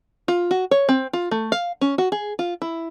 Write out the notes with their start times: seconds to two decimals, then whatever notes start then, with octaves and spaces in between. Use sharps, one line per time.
0.28 F4
0.51 F#4
0.71 C#5
0.89 C4
1.13 F4
1.31 A3
1.52 F5
1.81 C#4
1.98 F#4
2.12 G#4
2.39 F4
2.62 E4